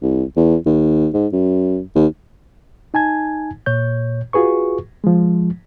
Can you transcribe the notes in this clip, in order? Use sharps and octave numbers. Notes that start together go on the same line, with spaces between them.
C2
E2
D#2
G#2
F#2
D#2
D#4 G#5 A5 G#6
A#2 C#5 G6
F4 F#4 G#4 B4 C#6
F3 G#3